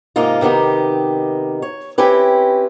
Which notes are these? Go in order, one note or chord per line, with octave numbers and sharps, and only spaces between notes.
G#2 C3 A#3 D#4 F4
C3 D#3 B3 D#4 G4
C#5
C4 C#4 E4 G4 B4